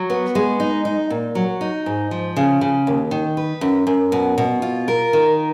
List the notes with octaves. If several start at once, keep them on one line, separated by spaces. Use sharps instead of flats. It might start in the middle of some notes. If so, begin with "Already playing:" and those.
Already playing: F#3
B3
G#3
D#4
D#4
A#2
F#3
D#4
G#2
F3
C#3
C#3
D#2
D#3
B4
F#2
F#2
B2
B2
F4
A#4
D#3